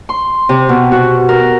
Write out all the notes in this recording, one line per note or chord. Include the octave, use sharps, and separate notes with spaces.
C6
C3
B2
F#4
A#4